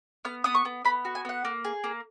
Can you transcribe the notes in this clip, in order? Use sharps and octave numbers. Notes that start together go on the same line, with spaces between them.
B3 F6
B3 D#6
C#6
B3
B3 B5
F#4
G#5
B3 F#5
A#3
G#4
A#3